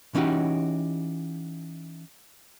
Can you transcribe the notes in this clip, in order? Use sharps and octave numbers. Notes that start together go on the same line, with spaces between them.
E3 C#4 D#4 F#4 G4